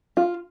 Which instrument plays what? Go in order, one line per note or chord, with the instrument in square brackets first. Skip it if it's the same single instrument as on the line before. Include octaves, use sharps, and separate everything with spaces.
[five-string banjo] F4